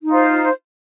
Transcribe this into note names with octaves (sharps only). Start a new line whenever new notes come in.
D#4 F4 C5